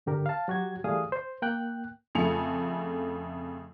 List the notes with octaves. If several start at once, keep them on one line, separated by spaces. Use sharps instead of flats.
G2 D3 G4 A#4
F5 A5
F#3 F#4 G4 G#6
E3 G3 A3 G#4 F5 D#6
C5
A#3 G5 F#6
F2 C#3 A3 G#5 C#7 F7